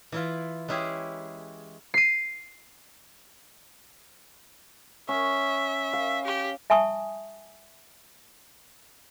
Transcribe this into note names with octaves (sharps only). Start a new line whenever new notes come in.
E3 E4 F4
G#3 C#4 E4 G4 G#4
C7 D#7
C#4 E5
F5
G4
E5 G#5 A5 C#6 D#6